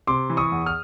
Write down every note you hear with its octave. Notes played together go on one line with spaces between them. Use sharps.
C3 C6 D6
E3
C#6 D#6
E2
D#6 F6